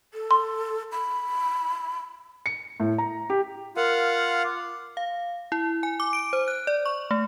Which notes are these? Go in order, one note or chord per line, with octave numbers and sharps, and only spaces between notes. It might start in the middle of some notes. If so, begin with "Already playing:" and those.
A4
C6
B5
C#7
A2
A#5
G4
F4 A#4 F5 F#5
D6
F5
E4
G#5
D6
D7
C5
F#6
D5
C#6
A3